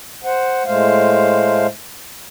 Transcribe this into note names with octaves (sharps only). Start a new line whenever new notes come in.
C5 F#5
A2 G#3 A3 C5 F5